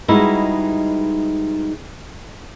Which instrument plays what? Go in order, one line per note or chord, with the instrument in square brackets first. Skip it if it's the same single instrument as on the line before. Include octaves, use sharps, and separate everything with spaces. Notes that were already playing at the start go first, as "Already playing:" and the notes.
[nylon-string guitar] G3 G#3 B3 D#4 E4 F#4